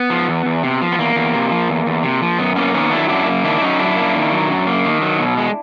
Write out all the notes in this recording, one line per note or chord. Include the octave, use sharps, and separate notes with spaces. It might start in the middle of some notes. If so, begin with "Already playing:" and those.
Already playing: B3
F3
E2
E2
C3
F3
B3
E2 A#3
E2
C3
F3
E2
E2
C3
F3
F#2 B3
A#3 B3 C#4
D#3 B3 C#4
F#3 D4 E4
F#2 D4 E4
A#3
D#3 D4 E4
E4
F#3 C#4 D#4
F#2 D4 E4
A#3
D#3
F#3
F#2
A#3
D#3
F#3
B2
G#3